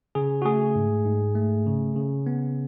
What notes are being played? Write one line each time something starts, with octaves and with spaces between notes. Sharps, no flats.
C#3 G#4
F#4
A3 G#4
G#2
G#2
A3
C#3
C#3
B3